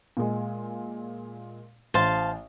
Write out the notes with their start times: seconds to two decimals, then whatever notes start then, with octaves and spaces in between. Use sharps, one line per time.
0.17 A#2 G#3
1.94 A1 C5 F5 A5